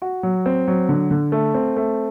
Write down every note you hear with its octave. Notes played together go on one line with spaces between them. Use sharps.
F#4
F#3
C4
F#3
D3
D3
A3
C4
A3